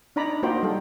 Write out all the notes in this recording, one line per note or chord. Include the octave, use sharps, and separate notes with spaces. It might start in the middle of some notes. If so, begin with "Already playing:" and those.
D4 D#4 D5 A#5 B5
A#3 D#4 F4 F#4 C5 G5
G3 A4